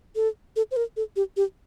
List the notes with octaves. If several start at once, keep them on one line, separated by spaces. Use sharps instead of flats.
A4
A4
C5
A#4
A4
G4
G4